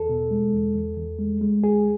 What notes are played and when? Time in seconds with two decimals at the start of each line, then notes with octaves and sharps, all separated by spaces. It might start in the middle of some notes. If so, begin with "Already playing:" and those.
Already playing: E2 A4
0.09 B2
0.31 G#3
0.54 E2
0.76 E2
0.97 E2
1.19 G#3
1.41 G#3
1.63 D2 G#4